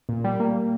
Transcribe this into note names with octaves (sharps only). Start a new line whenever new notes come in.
A#2
G3
A#3